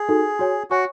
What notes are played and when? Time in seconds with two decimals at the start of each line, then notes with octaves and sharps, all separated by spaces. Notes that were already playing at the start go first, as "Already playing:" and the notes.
Already playing: G#4
0.09 D#4 F#4 A4
0.39 F#4 C#5 G#5
0.71 F#4 C#5 G#5 C#6